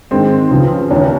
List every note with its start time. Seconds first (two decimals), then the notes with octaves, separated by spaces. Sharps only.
0.11 G#2 D#3 G#3 C4
0.51 C#2 C#3 F3
0.91 D#2 C#3 E3 C#4